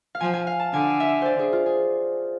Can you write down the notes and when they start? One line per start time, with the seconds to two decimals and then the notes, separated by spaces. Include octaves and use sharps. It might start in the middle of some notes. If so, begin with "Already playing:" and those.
0.15 F5
0.21 F3 G#5
0.33 G#5
0.47 F5
0.60 A5
0.73 D3 G#5
1.00 E5
1.22 C5 D5
1.39 G#4
1.53 F4
1.66 G#4